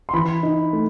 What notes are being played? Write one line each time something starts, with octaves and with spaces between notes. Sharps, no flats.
C6
E3 B5
D#4
A3